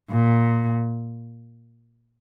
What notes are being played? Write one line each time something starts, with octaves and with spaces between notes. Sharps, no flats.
A#2